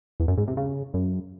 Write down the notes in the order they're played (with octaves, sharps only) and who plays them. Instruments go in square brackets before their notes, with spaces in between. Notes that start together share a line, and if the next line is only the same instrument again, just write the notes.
[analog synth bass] E2
F#2
G#2
C3
C#3
F#2